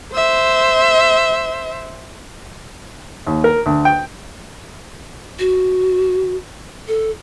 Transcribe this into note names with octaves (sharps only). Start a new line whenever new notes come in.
C5 E5
D#2
A#4
D2
G5
F#4
A4